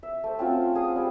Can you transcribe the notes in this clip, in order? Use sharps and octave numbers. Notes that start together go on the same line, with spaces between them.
E5
A3 C5
C4 C#4 F4 F#4
G#4 D#6
G3 G5